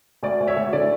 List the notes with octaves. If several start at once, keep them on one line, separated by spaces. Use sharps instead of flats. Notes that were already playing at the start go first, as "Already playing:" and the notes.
D2 D5
D2
C#5 E5
D2
D3 D5